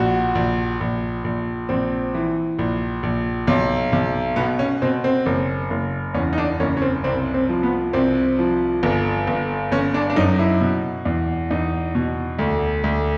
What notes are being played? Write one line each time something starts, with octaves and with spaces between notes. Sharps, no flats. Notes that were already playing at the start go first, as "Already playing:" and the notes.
Already playing: A#1 F#4
A#1
A#1
A#1
A#1 C4
E3
A#1
A#1
B1
B1
B2 B3
C#4
B2 C4
C4
F#1
F#1
E2 C#4
D#4
D4
F#1 C#4
C#4
C4
C2 C4
C4
F3
B3
C2 C4
F3
G1
G1
G1 C#4
D4
D4
F#2 D#4
E4
B2
E2
E2 D#4
B2
D2
D2